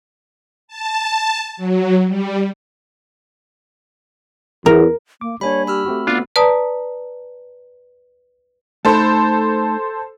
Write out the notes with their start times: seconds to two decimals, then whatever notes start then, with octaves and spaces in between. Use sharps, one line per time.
0.68 A5
1.57 F#3
2.07 G3
4.66 E2 A#4
5.21 A#3 D6
5.41 G3 A#3 D4 C#5 G#5 B5
5.67 G4 B5 E6 F6
5.86 A3 C4 F#4
6.07 B3 D4 F4
6.36 B4 D5 A5 A#5 D#6
8.85 A3 D#4 A4 C5 B5